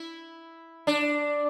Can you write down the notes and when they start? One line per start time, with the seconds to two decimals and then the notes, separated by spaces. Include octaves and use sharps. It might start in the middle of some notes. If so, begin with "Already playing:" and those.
Already playing: E4
0.87 D4